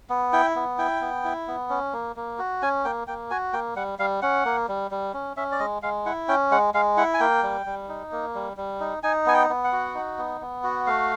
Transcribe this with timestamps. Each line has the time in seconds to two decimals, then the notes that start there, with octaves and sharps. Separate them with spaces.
0.10 B3
0.33 E4 G5
0.56 B3
0.78 E4 G5
1.01 B3
1.24 E4
1.48 B3
1.70 C#4
1.93 A#3
2.16 A#3
2.39 F#4
2.62 C#4 G#5
2.85 A#3 G5
3.07 A#3 G5
3.30 F#4 G#5
3.53 A#3 G5
3.76 G3 F#5
3.99 G3 F5
4.22 C#4 F#5
4.45 A#3
4.68 G3
4.91 G3
5.14 C#4
5.37 C#4 E5
5.52 D5
5.59 G#3 D#5
5.82 G#3 F5
6.06 E4 F#5
6.28 C#4 G5
6.51 G#3 F#5
6.74 G#3 F5
6.97 E4 F#5
7.14 G#5
7.20 A#3 G5
7.43 G3
7.66 G3
7.89 D#4
8.12 A#3
8.35 G3
8.57 G3
8.80 D#4
9.03 D#4 G#5
9.26 B3 G#5
9.34 G5
9.49 B3
9.64 F#5
9.72 F#4
9.95 D#4
10.18 B3
10.41 B3
10.64 F#4
10.87 A3 F5